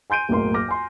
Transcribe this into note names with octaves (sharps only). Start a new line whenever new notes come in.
G#5 C6 G6 D7 D#7
F#1 B1 A2 A#3 C6
D6 F6 A#6
G#5 C6